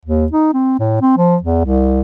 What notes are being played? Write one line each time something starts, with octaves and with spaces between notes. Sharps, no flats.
D#2
D#4
C4
A2
C4
F3
E2
C2